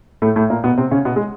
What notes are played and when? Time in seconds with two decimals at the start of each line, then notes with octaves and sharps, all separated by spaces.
0.22 A2 A3
0.36 A2 A3
0.50 A#2 A#3
0.64 B2 B3
0.78 C3 C4
0.91 C#3 C#4
1.05 B2 B3
1.16 G#3